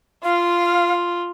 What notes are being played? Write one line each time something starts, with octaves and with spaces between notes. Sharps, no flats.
F4 F5